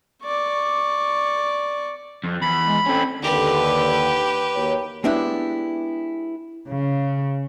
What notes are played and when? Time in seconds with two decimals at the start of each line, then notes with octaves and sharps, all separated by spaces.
0.23 D5 C#6
2.24 F2
2.42 E2 B5
2.67 G#3
2.86 C4 C#4 A4
3.22 D#2 D3 G4 B4
4.56 D#2 F#3 C#5
5.04 G#3 B3 D4 E4 G4
6.67 C#3